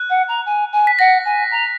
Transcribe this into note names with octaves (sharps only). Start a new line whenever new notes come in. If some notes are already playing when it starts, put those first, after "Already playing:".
Already playing: F#6
F#5
A#5
G#5
G#5
B6
F#5 A#6
G#5
A#5